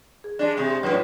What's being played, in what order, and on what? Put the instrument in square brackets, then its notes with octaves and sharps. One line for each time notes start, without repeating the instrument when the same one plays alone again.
[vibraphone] G#4
[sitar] G#3 D4
C3 G#3
[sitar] F#2 A2 [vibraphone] F4 B4 C#5